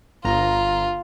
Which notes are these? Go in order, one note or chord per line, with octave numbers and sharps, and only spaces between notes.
G1 F4 A#5